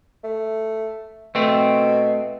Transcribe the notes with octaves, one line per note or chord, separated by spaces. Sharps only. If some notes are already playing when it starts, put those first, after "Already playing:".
A3
B2 A3 C4